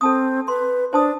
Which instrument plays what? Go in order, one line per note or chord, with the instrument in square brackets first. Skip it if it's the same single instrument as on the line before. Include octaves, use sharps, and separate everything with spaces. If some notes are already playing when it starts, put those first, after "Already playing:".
[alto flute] C4 [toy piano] A4 A5 D#6
[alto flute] B4 [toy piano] C6
[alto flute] D4 [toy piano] C5 A5 D#6